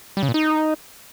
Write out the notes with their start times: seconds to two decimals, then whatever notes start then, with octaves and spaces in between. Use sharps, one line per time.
0.17 G3
0.23 C#3
0.28 A#2
0.34 D#4